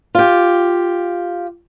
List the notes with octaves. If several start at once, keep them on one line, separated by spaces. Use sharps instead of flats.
F4 G4